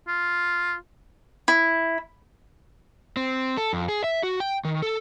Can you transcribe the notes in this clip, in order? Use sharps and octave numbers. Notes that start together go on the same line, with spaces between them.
F4
E4
C4
A4
F2
G#4
E5
F#4
G5
D#3
A4